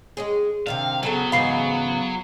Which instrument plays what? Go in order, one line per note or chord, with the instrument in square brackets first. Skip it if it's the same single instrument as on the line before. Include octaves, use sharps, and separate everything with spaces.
[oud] G#3 C#4 G#4
[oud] C3 D#3 D4 [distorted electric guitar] F5
[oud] C#3 A4 [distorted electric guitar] F#3 [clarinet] B3
[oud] G#2 C#3 E3 [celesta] F5 B5 C7